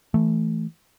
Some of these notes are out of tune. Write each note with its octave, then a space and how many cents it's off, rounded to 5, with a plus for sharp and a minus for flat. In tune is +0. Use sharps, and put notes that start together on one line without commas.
E3 +0 A3 +0